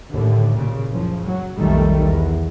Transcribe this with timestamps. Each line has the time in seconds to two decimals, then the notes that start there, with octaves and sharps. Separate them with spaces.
0.10 D#2 A2 D3
0.55 A#2 C#3
0.87 F#1 C#3 F3
1.24 F#3
1.57 B1 F2 D#3 G3 A3
1.97 E2